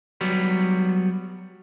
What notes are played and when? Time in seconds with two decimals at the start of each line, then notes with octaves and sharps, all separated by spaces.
0.21 F#3 G3 B3